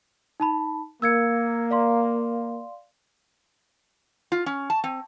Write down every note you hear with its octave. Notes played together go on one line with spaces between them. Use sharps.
D#4 A5 B5
A#3 E6 G#6 C#7
D5 F5 C6
F4
C#4
A5
C4